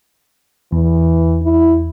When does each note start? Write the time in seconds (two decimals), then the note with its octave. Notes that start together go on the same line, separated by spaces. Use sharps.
0.72 E2 E3
1.42 E4